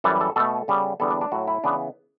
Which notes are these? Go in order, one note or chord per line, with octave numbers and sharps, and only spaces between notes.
F#2 E3 G3 A4
A4
B2 A3 A4
C#3 G3 B3
E2 D3 G3 B3 A4
D4
D4
A2 F#3 A3 F#4
E4
C#3 E3 B3 D4